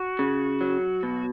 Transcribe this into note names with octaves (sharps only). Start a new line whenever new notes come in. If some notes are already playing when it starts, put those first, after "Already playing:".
Already playing: F#4
C#3
F#3
B2